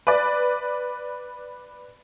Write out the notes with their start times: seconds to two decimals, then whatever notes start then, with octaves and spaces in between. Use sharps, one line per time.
0.07 B4 D5